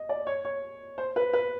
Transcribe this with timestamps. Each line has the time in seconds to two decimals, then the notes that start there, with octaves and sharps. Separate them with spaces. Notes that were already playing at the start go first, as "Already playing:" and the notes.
Already playing: D#5
0.09 D5
0.27 C#5
0.45 C#5
0.98 C5
1.16 B4
1.33 B4